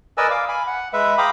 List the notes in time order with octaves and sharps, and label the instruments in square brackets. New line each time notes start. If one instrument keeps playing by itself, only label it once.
[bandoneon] A#4 B4 D5 D#5 G#5 E6
F5 D6
G#5 B5
F#5
G#3 B4 E5
F5 G5 A#5 B5 D6 D#6